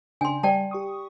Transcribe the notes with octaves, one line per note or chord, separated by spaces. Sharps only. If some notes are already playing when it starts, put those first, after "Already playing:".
C#3 D4 G5 G#5 C6
G3 D5 G5 A5
G4 C#6 D#6